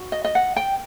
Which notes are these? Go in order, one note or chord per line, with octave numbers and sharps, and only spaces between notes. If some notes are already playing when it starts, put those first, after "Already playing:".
Already playing: F#4
D#5
D#5
F#5
G5